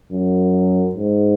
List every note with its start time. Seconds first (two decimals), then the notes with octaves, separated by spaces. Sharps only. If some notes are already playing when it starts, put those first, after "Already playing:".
0.12 F#2
0.95 G#2